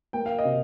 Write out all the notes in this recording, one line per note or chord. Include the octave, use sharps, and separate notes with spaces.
A#3 G5
F5
D#5
C3